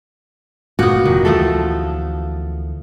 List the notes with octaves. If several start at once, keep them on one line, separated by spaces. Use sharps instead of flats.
G1 F#2 A#2 A#3 B3 F#4
F1 E2 D#3
D2 E3 F3 A3 A4